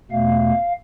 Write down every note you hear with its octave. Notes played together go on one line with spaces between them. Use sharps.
E2 B2 A3 F5